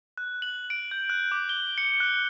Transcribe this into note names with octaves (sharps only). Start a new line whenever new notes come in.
F#6
F#7
D7
G6
F#6
D6
G7
C#7
F#6